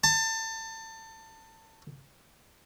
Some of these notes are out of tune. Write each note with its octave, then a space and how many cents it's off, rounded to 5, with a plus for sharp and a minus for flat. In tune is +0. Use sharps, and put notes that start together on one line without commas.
A5 +25